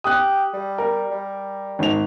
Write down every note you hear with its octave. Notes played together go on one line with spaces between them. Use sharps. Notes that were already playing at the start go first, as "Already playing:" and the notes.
G4 D#6 F#6
G3
A#4
G3
G#1 F7